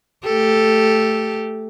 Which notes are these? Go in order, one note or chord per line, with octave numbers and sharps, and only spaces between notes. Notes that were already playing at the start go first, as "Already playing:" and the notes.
A3 G4 A4